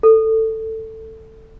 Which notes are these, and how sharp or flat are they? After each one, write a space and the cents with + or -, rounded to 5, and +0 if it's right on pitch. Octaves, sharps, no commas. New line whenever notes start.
A4 +15